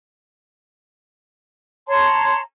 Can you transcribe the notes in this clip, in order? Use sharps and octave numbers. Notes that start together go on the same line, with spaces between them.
C#5 A5 A#5 C6